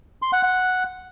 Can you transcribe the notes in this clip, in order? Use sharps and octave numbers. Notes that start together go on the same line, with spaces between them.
C6
F#5
F#5